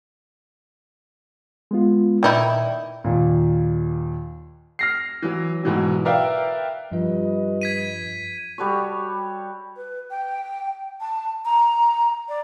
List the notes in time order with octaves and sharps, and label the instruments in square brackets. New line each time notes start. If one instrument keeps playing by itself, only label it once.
[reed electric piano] G#3 B3 F4
[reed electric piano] A#2 D5 G5 [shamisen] D#3 D#4 E4
[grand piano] D#2 A#2
F6 A#6 C7
E3 F#3
G#2 B2 E3 F#3
A#4 B4 D5 E5 F5 G5
[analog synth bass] G2 [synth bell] F3 F4 [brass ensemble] G3 B4 D#5
[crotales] G#6 B6 D#7
[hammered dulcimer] G3 F#4 A4 C#5
[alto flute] B4
G5
A5
A#5
D5